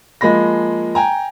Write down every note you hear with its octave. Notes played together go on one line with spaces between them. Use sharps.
F3 G#3 A#3 B5 A#6
G5 G#5 A#5